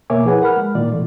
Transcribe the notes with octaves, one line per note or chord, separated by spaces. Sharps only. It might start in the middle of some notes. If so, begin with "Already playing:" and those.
B2 A#3 C#5 E5 G#5 D6
F3 E4 G#4 B4 F#5 G#5
A#4 F#5 B5 F6
G#3
A#2 D#3 F4 D5
B2 E3 A3 F4